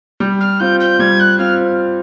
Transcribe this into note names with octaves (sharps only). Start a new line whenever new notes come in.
G3
F6
C4 F4 G6
G6
G3 G#6
F#6
C4 F4 F6